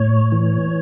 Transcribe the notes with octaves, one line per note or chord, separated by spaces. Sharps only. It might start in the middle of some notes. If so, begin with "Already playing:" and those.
Already playing: A2 C#5
E3